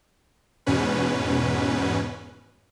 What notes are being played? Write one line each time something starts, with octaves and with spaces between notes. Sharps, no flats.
E2 G#2 B2 C#4 B4